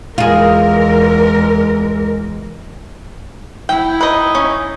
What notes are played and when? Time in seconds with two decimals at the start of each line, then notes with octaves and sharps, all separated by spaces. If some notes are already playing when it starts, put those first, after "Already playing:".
0.18 E2 G#3 F4 G#4 A#4
3.69 E4 G5
4.01 D#4 B4 D#5
4.35 C#4